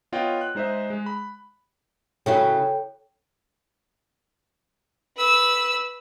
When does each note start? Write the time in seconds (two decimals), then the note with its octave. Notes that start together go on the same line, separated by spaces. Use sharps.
0.12 B3 F4 C#5 D#5 F#5 G5
0.41 F#6
0.55 G#3 D#4 C5 D#5 E5
0.90 G#3
1.06 B5
2.26 C#3 F#3 E4 A4 C#5 G5
5.17 B4 E6